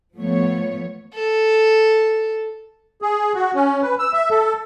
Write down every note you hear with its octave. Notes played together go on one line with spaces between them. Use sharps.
F3 A3 B3 C#5
A4
G#4
F#4
C#4
B4
E6
E5
A4